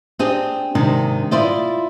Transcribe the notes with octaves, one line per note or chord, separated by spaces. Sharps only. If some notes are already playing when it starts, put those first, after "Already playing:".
C4 D4 G4 G#4 D#5
G#2 C3 D#3 D4
E4 F4 C5 D5 D#5